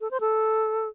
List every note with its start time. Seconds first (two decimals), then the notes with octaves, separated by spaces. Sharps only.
0.01 A4
0.11 C5
0.21 A4